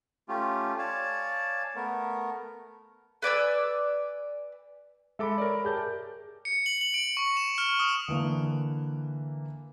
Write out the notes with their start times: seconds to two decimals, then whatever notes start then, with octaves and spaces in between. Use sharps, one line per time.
0.29 A3 C#4 F4 G4
0.79 C#5 D5 F5 G#5 A5
1.76 A3 B3 A#4
3.22 B4 D5 G#5 E6
5.19 G#3 A4 E5 B5 D6
5.38 A#4 C#5 D5
5.65 G4 G#4 A#4 A5 G6
6.45 C#7
6.66 F#7
6.81 F#7
6.94 D7
7.17 C#6
7.37 E7
7.58 F6
7.80 D#6
8.08 D3 E3 A#3